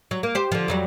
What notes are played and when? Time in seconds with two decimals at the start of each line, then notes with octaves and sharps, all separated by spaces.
0.11 F#3
0.23 A#3
0.35 G4 C5
0.52 D3 F3
0.68 F2 F#3 G3